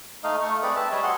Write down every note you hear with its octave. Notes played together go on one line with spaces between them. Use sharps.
A3 D#4 D#5 F5
A3 C#6
C4 G#4 B4 D5
E5 A5
G3 G#4 C#5 D#5
F#4 G#4 F#5 C6